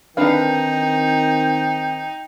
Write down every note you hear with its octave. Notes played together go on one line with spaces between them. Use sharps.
D#3 C4 D4 D#4 B4 F5 G5